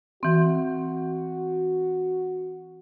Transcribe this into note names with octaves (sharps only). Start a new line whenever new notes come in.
E3 C4 F#4